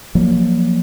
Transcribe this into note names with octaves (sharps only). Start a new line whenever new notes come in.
F3 F#3 A#3